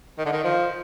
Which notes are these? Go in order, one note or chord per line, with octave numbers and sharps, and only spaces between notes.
D#3
D3
D#3
F3